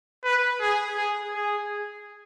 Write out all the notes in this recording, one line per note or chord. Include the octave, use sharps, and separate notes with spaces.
B4
G#4
G#4
G#4